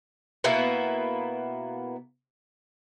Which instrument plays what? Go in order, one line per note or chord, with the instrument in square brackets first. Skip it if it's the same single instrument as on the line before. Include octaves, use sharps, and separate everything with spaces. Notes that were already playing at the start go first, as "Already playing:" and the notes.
[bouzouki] B2 A#3 B3 E4